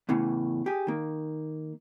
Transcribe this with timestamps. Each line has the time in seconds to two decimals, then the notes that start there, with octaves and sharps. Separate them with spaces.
0.09 E2 A2 C#3 E3
0.66 G4 G#4
0.87 D#3 A#3